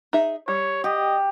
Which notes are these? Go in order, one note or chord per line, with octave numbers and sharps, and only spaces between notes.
D#4 G#4 E5
G3 C#5
G4 D#5